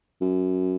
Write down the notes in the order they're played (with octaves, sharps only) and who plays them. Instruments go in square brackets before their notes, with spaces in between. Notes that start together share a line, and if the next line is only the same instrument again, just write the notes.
[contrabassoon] F#2